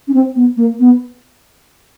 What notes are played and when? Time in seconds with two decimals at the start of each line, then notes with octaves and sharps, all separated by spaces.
0.08 C#4
0.14 C4
0.36 B3
0.57 A#3
0.80 B3